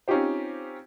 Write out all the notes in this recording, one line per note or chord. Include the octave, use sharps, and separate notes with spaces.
C4 C#4 D#4 F4 G4 C5